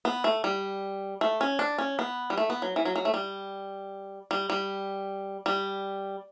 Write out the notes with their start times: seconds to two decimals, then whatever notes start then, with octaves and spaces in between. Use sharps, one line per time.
0.05 B3
0.24 A3
0.44 G3
1.21 A3
1.41 C#4
1.59 D4
1.78 C#4
1.99 B3
2.30 G3
2.38 A3
2.50 B3
2.62 F#3
2.76 E3
2.85 F#3
2.96 F#3
3.05 A3
3.14 G3
4.31 G3
4.50 G3
5.46 G3